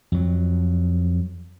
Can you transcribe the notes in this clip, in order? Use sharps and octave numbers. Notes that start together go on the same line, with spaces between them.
F2 F#3